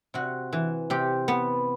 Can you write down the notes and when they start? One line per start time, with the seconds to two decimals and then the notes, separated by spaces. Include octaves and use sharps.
0.14 C3 F#4
0.53 E3
0.90 C3 G4
1.28 B3